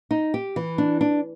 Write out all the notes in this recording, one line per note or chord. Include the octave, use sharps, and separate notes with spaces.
D#4
G4
E3
D4
D4